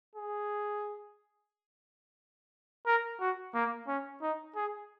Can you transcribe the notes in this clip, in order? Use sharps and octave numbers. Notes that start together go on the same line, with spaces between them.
G#4
A#4
F#4
A#3
C#4
D#4
G#4